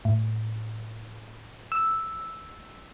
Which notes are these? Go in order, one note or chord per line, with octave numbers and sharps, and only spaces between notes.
A2
E6